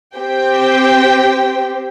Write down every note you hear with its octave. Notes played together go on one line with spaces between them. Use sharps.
C4 G4 G5